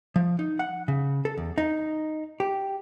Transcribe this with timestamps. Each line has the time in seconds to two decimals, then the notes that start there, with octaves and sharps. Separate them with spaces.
0.16 F3
0.39 D#4
0.59 F#5
0.88 C#3
1.25 A4
1.37 E2
1.58 D#4
2.40 G4